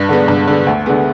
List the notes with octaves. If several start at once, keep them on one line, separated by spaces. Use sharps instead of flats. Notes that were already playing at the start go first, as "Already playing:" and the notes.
Already playing: G2
D3 G#3 B3
G2
D3 G#3 B3
D2
D3 G#3 B3